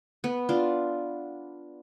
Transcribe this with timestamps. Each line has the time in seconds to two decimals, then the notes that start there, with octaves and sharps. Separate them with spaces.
0.24 B3
0.49 D4 F4